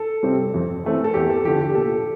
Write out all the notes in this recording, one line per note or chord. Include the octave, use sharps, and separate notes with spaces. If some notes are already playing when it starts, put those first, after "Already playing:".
Already playing: A4
C3 G3 C4
F2
E3 A3 C4
A4
E2 G4
A4
D3 F3 G4
G4
A#2 A4